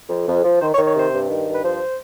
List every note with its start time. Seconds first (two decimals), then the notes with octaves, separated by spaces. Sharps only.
0.09 F2
0.27 F2
0.44 F3
0.61 D#3 C5
0.74 C#5
0.78 D#3
0.87 C#5
0.95 C3 C5
1.12 G2
1.30 D#3
1.47 G2
1.54 B4
1.63 F3 C5